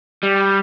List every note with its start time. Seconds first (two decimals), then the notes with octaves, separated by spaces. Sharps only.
0.23 G3